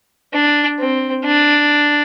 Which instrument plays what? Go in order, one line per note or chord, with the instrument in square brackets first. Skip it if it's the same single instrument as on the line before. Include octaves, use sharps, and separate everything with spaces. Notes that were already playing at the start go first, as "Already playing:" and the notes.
[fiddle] D4
C4
D4